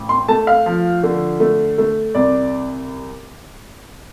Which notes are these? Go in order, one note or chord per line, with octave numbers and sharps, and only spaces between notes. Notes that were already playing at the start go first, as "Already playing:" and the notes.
Already playing: A1
C6
A3 A5
F5
F3
D3
A3
A3
C2 D5